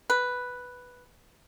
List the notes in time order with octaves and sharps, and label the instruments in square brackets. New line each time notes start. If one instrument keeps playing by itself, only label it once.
[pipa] B4